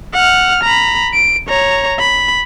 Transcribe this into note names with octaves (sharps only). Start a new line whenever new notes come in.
F#5 F6
A#5 B5
D7
C#5 A#5
B5